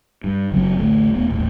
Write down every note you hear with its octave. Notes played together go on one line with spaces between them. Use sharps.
G2
F#1 F#3 C4
A1 D2 A3
D#1 A3 B3
D#1 A1 D#2